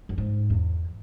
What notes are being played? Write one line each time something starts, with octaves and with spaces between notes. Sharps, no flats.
F#2
G#2
E2